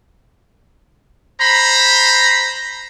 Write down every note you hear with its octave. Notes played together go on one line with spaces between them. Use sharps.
C5 A#5 B5